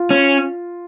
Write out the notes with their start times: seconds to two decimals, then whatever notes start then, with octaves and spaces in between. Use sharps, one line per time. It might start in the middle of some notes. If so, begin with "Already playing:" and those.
Already playing: F4
0.11 C#4